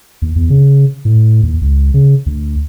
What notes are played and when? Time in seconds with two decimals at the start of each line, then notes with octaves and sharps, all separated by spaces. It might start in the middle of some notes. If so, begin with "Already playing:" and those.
0.22 D#2
0.36 E2
0.50 C#3
1.05 A2
1.43 D#2
1.61 C#2
1.94 C#3
2.26 D2